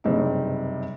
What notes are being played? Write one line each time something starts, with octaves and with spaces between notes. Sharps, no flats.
F#1 G2 C3 D#4